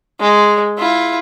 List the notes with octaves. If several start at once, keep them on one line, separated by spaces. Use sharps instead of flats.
G#3
E4 F4